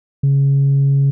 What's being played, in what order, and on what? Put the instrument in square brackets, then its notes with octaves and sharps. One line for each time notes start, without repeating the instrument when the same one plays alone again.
[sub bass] C#3